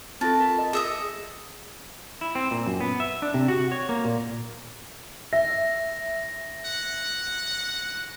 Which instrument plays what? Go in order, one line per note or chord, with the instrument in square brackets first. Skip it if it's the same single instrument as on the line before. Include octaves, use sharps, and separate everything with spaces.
[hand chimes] C4 F4 A4 [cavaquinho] A5
[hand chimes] A#4
D#5
[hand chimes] G#4 [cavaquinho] D#5 E5 D#6
[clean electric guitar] E4
C4
A#2
F#2
B3
E5
D4
C3
F#4
C#5
A#3
A#2
[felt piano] E5 [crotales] A#6
[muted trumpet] F#5